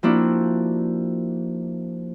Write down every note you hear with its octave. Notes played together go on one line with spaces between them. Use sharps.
F3 A#3 C4 D4 E4 F#4